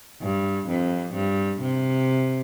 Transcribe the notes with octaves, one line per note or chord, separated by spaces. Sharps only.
G2
F2
G2
C3